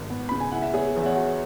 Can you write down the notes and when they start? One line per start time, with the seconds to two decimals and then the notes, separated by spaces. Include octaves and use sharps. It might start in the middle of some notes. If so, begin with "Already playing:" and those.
Already playing: G#1
0.10 B3
0.29 C#3 B5
0.40 G#5
0.52 E4 F#5
0.62 E5
0.74 B3 G#4 C#5
0.96 E2
1.02 E5
1.06 C#5 F#5
1.16 F#4